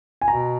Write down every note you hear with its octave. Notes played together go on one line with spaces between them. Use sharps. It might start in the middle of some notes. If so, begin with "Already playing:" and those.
G#5
B2 A#5